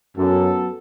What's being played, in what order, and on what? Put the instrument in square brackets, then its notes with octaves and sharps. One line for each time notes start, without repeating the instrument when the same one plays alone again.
[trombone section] F#2 [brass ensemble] F#3 B3 F#4 A4